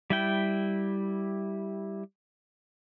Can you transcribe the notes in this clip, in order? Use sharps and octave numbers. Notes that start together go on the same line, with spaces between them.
G3 E4 G5